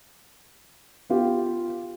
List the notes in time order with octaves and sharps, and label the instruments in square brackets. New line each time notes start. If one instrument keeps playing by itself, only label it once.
[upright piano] B3 F4 G4